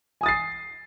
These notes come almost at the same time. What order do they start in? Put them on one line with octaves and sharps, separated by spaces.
G#5 D#6 A6 C7